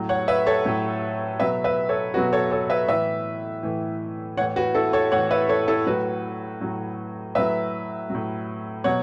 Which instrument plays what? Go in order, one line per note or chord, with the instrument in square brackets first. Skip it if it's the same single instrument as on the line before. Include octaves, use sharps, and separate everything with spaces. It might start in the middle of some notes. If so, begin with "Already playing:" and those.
Already playing: [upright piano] A2 F#3
C#5 F#5
B4 E5
A4 C#5
A2 F#3
B2 F#3 B4 E5
B4 E5
A4 C#5
B2 F#4 B4
F#3
A4 C#5
A4 C#5
B4 E5
A2 E3 B4 E5
A2 E3
E3 C#5 F#5
A2
F#4 B4
E4 A4
A4 C#5
A2 C#5 F#5
E3
B4 E5
A4 C#5
E4 A4
A2 F#3 F#4 B4
A2 F#3
A2 F#3 B4 E5
A2 F#3
B2 F#3 C#5 F#5